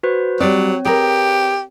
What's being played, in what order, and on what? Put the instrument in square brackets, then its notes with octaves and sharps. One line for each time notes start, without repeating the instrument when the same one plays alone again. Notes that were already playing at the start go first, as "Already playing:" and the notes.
[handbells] F#4 B4 C5
[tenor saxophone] F#3 [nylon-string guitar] G3 D5 [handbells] C4 C#5
[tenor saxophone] G4 [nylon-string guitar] G#4 A#4 B4